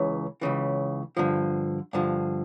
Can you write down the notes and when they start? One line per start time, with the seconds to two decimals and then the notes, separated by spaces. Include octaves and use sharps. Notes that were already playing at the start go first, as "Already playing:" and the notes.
Already playing: C#2 C#3 E3
0.41 C#2 C#3 E3
1.17 G2 D3 F3
1.93 G2 D3 F3